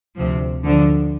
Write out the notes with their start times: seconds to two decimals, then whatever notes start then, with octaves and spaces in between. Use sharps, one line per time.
0.17 D2 C3 F3
0.64 D2 D3 F3